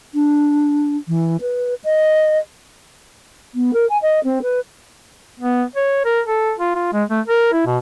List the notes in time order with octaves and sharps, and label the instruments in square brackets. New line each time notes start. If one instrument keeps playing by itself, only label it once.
[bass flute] D4
E3
B4
D#5
[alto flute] B3
A#4
G#5
D#5
C4
B4
[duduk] B3
C#5
A#4
A4
F4
F4
G#3
A3
A#4
E4
B2